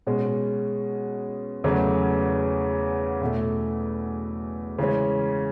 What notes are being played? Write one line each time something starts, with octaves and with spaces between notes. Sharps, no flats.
B2 G#3 C#4
E2 C#3 F#3 A3 C#4
E2 B2 A3
C#3 E3 G#3 C#4